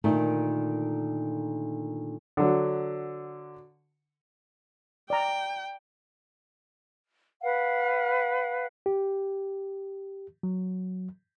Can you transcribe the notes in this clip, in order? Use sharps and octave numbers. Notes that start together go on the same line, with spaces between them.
A#2 D3 D#3 A3
D3 F#3
D5 G5 A#5
B4 F5 F#5
G4
F#3